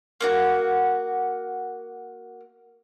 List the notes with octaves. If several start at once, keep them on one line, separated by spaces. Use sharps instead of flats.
A#3 D4 F#4